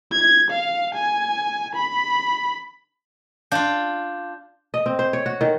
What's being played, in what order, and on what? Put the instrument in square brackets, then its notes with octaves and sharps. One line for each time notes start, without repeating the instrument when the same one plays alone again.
[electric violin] G#6
F5
G#5
B5
[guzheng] D4 F4 [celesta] F5 G6
[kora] D#5
C4
C5
C#5
F#4
D#3